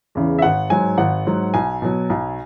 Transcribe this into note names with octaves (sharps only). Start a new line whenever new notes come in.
E2 C#3 E3
E5
G#1 F#5
G#2 F#3 G#5
G#1 F#5
G#2 F#3
B1 G#5
B2 F#3
B1